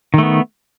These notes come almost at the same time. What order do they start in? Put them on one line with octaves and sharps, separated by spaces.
D#3 A3 B3